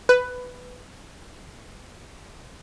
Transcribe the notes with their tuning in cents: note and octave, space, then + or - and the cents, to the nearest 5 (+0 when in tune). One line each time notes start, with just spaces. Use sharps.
B4 +10